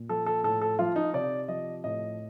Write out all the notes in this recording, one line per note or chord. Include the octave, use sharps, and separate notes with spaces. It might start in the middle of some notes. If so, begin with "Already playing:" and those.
Already playing: A#2
F3 A4
A4
A2 A4
A4
F3 F4
D#4
C3 D5
F3 D#5
A2 D#5